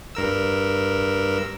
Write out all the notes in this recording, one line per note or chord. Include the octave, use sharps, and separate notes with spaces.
G2 A#4 E6